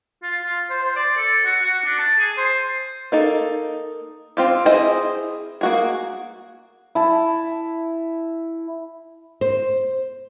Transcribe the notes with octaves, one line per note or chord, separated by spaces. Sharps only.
F4
F4
C5
C5
D5
A4
F#4
F#4
D4
A5
G#4
C5
A#3 D#4 A4
C4 F4 G4
E4 G#4 C5 D#5
A#3 F#4 G#4
E4 A5
C5